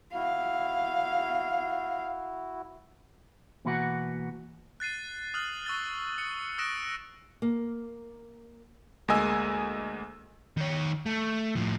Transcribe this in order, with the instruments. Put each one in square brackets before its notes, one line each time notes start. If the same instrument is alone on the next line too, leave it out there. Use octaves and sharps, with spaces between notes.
[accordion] E4 F#4 [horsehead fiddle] F5
[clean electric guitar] B2 E3 A#3 B3 F#4 F#5
[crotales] F#6 A6 C7 D#7
D#6 F6 F#6 F#7
C#6 E6 F6 A6 G7
D#6 C#7
D#6 E6 F#6 A#6 D7 E7
[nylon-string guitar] A#3
[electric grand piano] D2 G#3 A#3 D#5 G#5 E6
[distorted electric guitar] D#3 C#5
A3
A2 F3